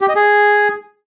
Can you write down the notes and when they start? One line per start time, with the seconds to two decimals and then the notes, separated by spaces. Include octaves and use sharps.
0.01 G4
0.09 D#5
0.16 G#4